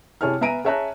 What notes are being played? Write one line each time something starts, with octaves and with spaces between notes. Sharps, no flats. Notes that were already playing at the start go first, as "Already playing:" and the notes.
C3 E4 G#4 C#5 A5 F6
B3 E5 G#5 A#5 D7 D#7
G#4 C#5 E5 A5 A#5 F#6